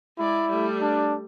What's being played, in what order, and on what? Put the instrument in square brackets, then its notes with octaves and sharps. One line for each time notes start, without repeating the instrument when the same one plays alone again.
[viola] G#3 D5 [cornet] E4
[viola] G3 A3
[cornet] D4